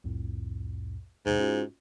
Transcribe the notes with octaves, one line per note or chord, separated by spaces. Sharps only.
C2 F2 A2
D#2 G#2 B2
C#4 F4 F#4